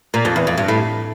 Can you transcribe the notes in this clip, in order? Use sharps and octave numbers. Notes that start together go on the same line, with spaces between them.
A#2
F2
E2
F2
G2
A2